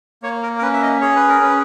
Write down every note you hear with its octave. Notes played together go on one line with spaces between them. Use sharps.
A#3 C#5
A#4
A#4
C#4 B4
E5
D#5
G#4 C#5
B4
A#4
C#4 B4